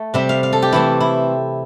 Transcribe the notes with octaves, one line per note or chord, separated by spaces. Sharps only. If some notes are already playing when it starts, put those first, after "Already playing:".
Already playing: A3
C3 G3 C4 E5
F5
F5
A4
G4
E3 A3 C4 E4
E4